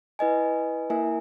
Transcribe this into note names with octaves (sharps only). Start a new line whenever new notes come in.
E4 B4 D#5 G#5
A#3 E4 A#4 E5 G#5